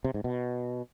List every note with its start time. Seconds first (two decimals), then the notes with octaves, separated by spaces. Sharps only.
0.04 C3
0.14 G#2
0.24 B2